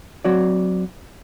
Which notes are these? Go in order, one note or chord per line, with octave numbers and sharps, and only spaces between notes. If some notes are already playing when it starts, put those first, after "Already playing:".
F#3 C4 F#4 C#5 D5